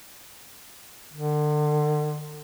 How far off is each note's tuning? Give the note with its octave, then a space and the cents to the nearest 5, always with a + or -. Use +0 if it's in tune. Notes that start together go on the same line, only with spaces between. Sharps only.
D3 +35